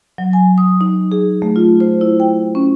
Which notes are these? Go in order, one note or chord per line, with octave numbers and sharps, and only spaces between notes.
F#3
G#5
D#6
D#4
G#4
A3
F4
C5
E4
G5
C#4